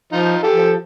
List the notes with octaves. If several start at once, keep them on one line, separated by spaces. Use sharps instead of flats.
F3 D#4 F4
G4 A4
F3